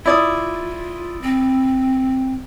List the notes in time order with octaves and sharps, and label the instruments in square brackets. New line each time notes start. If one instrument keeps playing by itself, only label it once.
[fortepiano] E4 D5 D#6 [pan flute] F4
[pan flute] C4